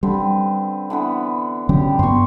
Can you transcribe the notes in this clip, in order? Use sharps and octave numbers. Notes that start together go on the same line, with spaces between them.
D3 G3 C4 B4
D3 E3 B3
D3 F#3 C#4 G4
G2 B3 C6 C#6